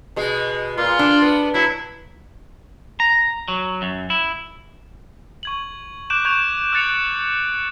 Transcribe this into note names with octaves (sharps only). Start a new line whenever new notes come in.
B2 G#3
A#2 F4
D4
B3
F#3 E4
A#5
F#3
F#2
E4
C#6 G#6 F#7
D6 F#6 G6 D7 E7 F#7
C#6 G6 G#6 D7 F7
E6 F#6 G6 A6 C#7 F7